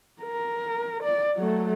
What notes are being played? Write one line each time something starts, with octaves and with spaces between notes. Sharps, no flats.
A#4
D5
F#3 A3